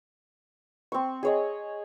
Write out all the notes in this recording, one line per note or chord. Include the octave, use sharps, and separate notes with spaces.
C4 C#6
G#4 C#5 D#5